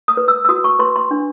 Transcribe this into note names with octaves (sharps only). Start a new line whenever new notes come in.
D#6
B4
E6
E6
F#4 D#6
C#6
B4 C6
C6
D4